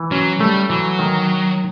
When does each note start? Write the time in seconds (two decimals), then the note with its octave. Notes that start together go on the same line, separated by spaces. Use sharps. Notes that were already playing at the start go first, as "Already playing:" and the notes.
Already playing: E3
0.11 F#3 C#4
0.40 G3 A3
0.69 E3 F#3
0.99 D#3